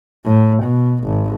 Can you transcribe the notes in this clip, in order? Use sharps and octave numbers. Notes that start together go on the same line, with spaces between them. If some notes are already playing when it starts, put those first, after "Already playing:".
A2
B2
G#1